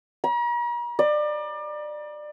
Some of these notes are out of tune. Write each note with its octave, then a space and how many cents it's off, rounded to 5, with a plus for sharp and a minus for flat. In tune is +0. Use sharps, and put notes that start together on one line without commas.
A#5 +45
D5 +30